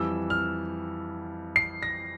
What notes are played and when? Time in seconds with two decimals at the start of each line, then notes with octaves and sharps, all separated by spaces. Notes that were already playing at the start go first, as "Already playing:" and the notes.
Already playing: F2 E3 G3 E6
0.30 F6
1.56 C7
1.83 A#6